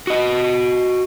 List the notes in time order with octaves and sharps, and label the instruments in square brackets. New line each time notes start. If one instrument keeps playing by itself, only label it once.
[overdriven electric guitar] F#4 D#5